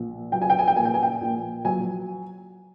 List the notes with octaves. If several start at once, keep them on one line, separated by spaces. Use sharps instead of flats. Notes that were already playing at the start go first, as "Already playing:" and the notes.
Already playing: A#1
F#3 G5
G#5
G5
G#5
G5
A#2 G#5
G5
G#5
G5
A#1
F#3 G#5